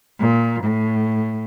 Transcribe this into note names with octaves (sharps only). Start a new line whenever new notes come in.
A#2
A2